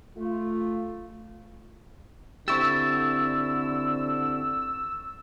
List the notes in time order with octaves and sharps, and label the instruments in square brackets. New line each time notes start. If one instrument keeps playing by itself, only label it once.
[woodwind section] A3 [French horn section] F4
[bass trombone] D3 [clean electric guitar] C4 E4 G4 [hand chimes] C#6 A6 [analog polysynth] E6